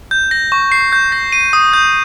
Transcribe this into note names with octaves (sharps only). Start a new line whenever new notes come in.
G6
A#6
C#6
C7
G6
A#6
D#7
D#6
G6